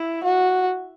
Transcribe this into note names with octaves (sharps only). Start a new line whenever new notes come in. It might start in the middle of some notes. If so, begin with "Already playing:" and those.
Already playing: E4
F#4